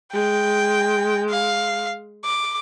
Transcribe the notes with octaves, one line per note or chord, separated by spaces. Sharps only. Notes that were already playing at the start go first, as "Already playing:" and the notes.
G#3 G5
F5
D6